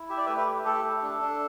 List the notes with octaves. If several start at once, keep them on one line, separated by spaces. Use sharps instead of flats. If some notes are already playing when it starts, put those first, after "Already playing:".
Already playing: E4
G4 E5
D5
A3 B4 E5
B4
G4
A3 A4
A3
D4
D4